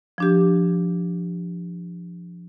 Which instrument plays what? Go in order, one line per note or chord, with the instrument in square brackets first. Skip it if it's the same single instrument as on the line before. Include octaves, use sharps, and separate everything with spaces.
[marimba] F3 D4 G4